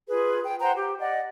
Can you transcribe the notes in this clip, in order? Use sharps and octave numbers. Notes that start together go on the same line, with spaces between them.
F4 G#4 B4
G5
C5 F#5 G5 A#5
G4
D5 D#5 F#5